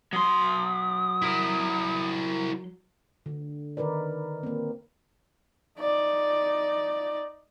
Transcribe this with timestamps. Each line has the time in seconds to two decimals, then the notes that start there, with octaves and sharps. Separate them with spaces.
0.13 F#3 C6 D#6
1.22 E4 A#4
3.26 D3
3.77 D#3 D#4 A#4 B4 D5
4.43 A#3 C4
5.79 D#4 D5